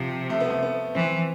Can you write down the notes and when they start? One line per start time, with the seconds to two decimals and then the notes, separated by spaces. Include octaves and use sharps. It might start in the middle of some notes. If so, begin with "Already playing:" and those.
Already playing: C3 F3
0.30 A3
0.40 B3
0.50 A3
0.63 B3
0.95 E3 C4